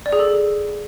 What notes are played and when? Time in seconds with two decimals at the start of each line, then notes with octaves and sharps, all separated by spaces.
0.06 D5
0.12 G#4
0.19 A4